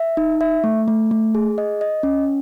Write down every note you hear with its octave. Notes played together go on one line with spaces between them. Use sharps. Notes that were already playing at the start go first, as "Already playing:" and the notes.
Already playing: E5
D#4
E5
A3
A3
A3
G#4
D#5
D#5
C#4